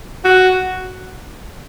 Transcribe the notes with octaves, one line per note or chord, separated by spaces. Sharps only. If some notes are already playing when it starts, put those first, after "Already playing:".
F#4